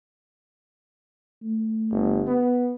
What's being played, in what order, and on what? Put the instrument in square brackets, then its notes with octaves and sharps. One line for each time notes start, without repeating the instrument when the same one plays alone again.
[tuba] A3
[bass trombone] G1
B3